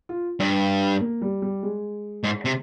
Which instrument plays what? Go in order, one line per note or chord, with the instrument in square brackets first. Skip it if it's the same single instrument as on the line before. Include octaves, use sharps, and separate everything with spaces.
[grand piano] F4
[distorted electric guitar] G2
[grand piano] A#3
G3
G3
G#3
[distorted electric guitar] G#2
C3